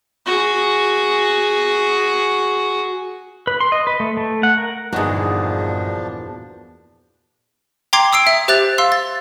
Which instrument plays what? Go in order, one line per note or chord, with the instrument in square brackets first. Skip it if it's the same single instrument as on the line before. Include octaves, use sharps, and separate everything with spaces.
[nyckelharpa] F#4 G#4
[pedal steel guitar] B4
C6
D#5
B4
A3
A3
F#5
A#4
[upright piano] G1 D#4 [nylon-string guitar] E2 A#2 [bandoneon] F3 D4 [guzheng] F#4 G#4
[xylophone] G5 A#5 C6 D6 G#6 C7
D#6 E6 C7 D7
E5
G4 C5 E5 F#6 A6 F7
F5 C6 E6
A6